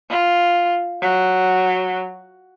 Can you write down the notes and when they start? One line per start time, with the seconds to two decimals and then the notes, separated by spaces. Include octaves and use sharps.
0.10 F4
1.02 F#3